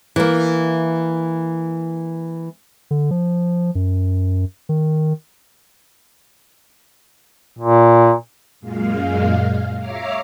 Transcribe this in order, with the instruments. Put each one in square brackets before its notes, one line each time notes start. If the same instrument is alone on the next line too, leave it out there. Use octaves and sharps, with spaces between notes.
[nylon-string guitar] E3 A#3
[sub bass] D3
F3
F#2
D#3
[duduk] A#2
[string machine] F#2 A#2 G#3 F5
C#5 E5 F5 A#5 D6 F6